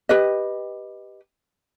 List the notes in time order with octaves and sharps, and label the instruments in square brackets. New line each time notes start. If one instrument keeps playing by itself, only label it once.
[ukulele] G4 B4 D#5